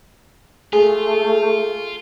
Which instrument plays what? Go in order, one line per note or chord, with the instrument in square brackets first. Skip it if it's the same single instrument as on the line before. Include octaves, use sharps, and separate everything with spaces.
[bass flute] A3 [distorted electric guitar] F4 [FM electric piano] G#4